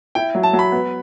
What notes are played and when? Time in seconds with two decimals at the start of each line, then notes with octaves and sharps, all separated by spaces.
0.15 E4 G5
0.35 F#3
0.43 A5
0.53 F#3
0.59 B5
0.72 B3